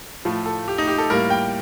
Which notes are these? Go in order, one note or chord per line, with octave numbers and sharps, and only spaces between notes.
A2 F3 A3 F4
A4
G4
D#4
G4
A4
A2 G3 A#3 A#4
G5